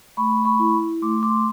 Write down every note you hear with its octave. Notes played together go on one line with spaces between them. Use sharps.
A3 B5 C#6
B5 C#6
E4
A3 C6 D6
C6 D6